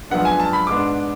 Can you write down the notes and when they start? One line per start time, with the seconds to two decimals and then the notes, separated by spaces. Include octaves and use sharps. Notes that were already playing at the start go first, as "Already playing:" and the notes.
0.10 F#2 F3 G#3 B3 D4 F#5
0.25 G#5
0.40 A5
0.53 B5
0.67 G#2 G#3 B3 D4 D6